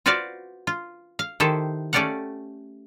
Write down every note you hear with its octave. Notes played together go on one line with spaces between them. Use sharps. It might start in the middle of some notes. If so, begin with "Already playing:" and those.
F4 F#4 B4 C5 D5 F5
F4
F5
D#3 E4 G4 A4 C5
A3 C#4 G4 D5 F5 F#5